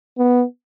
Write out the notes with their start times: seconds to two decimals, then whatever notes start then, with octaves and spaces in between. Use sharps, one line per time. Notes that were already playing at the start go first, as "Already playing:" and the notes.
0.18 B3